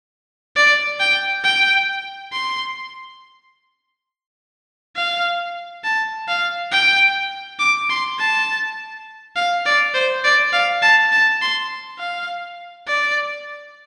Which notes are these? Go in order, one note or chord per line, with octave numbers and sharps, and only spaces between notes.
D5
G5
G5
C6
F5
A5
F5
G5
D6
C6
A5
F5
D5
C5
D5
F5
A5
A5
C6
F5
D5